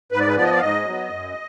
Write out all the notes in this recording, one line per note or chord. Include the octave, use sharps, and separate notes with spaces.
G#2 B4
D5
B4
F3 B3 D5
D#5
D5
F5
G#2 D#5
F#3 B3
F#2